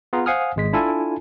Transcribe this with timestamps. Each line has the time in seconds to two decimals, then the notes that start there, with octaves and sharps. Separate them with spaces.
0.13 B3 F4 G#4 A#5
0.26 C5 F5 F#5 G#5 D#6 F6
0.56 G#1 G#3 B6
0.73 D4 E4 F4 A4 G#5 A5